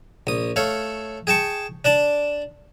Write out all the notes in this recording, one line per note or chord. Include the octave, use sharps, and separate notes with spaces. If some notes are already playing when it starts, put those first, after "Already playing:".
A#1 D#6
A3 A4 C#5 F5
G#4 G5 A5 C#6
D4 D5 A5